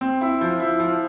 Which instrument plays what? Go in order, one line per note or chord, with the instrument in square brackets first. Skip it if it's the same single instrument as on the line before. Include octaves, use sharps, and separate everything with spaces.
[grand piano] C4
E4
F3
E4
F3